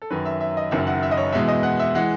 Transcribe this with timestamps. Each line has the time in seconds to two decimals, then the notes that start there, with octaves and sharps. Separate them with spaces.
0.02 A4
0.10 F#2 D#3 F#3 B4
0.25 E5
0.40 E5
0.57 D#5
0.71 F#1 F#2 D#3 F#3 E5
0.87 F#5
1.03 E5
1.11 D#5
1.17 C#5
1.33 E2 B2 G#3 B3 E5
1.48 D#5
1.63 F#5
1.79 E5
1.95 E3 G#3 F#5